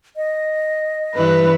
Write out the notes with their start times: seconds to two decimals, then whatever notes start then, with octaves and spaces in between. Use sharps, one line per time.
0.16 D#5
1.15 G2 E3 G3 B4